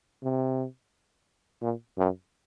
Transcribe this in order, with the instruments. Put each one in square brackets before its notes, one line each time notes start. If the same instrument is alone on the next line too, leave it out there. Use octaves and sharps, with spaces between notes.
[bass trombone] C3
A#2
F#2